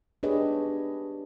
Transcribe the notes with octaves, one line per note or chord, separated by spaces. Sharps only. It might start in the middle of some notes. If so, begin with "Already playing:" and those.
D4 G4 G#4 B4 C#5 D#5